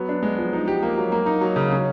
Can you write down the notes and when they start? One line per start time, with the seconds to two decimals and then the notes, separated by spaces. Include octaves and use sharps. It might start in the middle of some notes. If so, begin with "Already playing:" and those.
Already playing: F#3 B3
0.09 D4
0.23 G#3
0.38 F3
0.53 D#4
0.68 G4
0.83 A#3
0.98 F#3
1.12 A#3
1.26 D#4
1.41 F#3
1.56 C#3
1.71 C#4